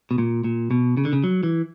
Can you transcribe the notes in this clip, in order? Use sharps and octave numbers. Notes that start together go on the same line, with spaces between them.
B2
A#2
A#2
B2
C#3
D3
C#3
F#3
E3